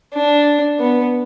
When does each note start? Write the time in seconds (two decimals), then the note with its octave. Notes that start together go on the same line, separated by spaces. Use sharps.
0.14 D4
0.80 B3